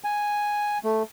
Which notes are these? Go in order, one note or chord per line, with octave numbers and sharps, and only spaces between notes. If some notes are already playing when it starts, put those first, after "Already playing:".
G#5
A3